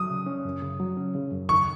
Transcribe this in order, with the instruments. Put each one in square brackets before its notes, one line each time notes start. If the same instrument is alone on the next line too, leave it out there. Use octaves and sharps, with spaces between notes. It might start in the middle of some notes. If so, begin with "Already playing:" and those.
Already playing: [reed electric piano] F#3 [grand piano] D#6
[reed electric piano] C#3
C#4
F#2
C#3
F#3
C#4
C#3
F#2
[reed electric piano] D#3 [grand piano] C#6